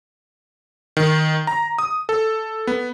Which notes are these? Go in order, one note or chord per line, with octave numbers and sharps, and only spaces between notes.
D#3
A#5
D#6
A4
B3